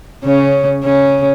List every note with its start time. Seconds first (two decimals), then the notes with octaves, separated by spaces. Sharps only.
0.25 C#3 C#4
0.84 C#3 C#4